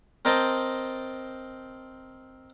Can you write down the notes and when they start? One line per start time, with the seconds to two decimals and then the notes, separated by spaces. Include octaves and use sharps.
0.25 C4 A#4 C5 D#5 G5 A5